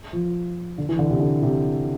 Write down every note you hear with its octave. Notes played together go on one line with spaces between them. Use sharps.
F3
D3
E3
D3
C3
D3
C3